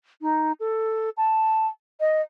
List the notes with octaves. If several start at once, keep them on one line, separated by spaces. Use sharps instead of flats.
D#4
A4
A5
D#5